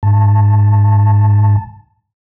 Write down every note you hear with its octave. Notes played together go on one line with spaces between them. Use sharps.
G#2 A5